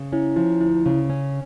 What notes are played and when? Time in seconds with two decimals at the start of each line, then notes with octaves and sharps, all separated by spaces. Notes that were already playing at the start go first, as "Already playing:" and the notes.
Already playing: C#3
0.12 C#4 E4
0.36 F3 E4
0.60 D2 E4
0.86 C#3
1.10 C#4